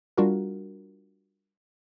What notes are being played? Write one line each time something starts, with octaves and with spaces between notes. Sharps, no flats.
G3 D4 F4 F#4 A#4